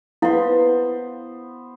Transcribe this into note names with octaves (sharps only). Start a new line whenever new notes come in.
B3 E4 C5 F5